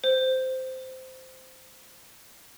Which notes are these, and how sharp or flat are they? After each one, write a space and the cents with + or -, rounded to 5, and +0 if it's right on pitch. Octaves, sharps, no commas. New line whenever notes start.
C5 -10